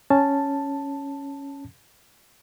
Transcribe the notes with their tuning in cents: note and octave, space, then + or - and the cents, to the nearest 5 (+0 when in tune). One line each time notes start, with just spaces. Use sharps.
C#4 +0 A5 +0